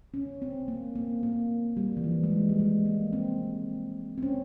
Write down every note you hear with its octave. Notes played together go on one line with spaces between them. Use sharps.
C#4
C4
A#3
A#3
A#3
G3
E3
F3
G#3
G3
G3
G#3
A#3
C4
C4
C#4